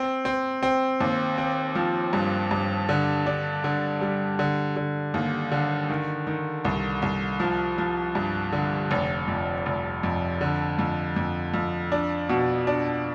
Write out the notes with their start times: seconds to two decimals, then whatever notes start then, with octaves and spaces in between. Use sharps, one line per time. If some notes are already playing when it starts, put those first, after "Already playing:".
Already playing: C4
0.25 C4
0.63 C4
1.00 D#2
1.38 C4
1.75 F3
2.13 G2
2.51 G2
2.89 D3
3.26 D4
3.64 D3
4.01 G3
4.39 D3
4.76 D3
5.14 D#2
5.52 D3
5.90 D#3
6.27 D#3
6.65 C2
7.02 C2
7.40 F3
7.78 F3
8.15 G2
8.52 D3
8.91 F1
9.28 F2
9.66 F1
10.03 F2
10.41 D3
10.79 F2
11.16 F2
11.54 F2
11.92 D4
12.29 B2
12.67 D4